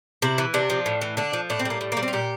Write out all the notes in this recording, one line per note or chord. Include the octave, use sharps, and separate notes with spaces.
C3 E4
E3
C3 D4
F3
A2
E3
D3 D4
F3
A2 D4
C4
G3
A#3
A2
A#3
G3
C4
F4
A#2 G4